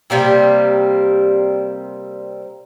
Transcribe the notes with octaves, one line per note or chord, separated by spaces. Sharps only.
C3 G3 A#3 C4